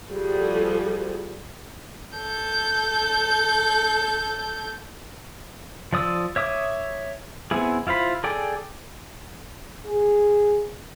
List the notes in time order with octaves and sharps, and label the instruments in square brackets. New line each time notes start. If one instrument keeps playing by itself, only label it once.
[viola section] F3 G3 F#4 G#4 A4
[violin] A4 G6
[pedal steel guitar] F3 D5 D#6 E6
C#5 E5 D6 D#6
B3 C4 E4 G#4
E4 F4 C5 B5
G#4 A4 D5 G5
[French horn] G#4